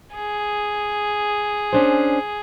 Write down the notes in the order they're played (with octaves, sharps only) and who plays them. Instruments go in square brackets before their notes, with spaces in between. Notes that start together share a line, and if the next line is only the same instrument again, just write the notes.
[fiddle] G#4
[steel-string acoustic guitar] C#4 D4 C5